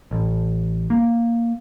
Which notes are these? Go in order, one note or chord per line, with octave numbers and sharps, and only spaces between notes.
A1
A#3